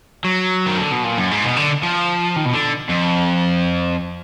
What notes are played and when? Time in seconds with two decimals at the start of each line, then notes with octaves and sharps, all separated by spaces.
0.25 F#3
0.66 D#3
0.78 D3
0.91 B2
1.04 A#2
1.17 F#2
1.31 G#2
1.44 B2
1.57 D3
1.83 F3
2.36 D#3
2.45 B2
2.53 D3
2.89 F2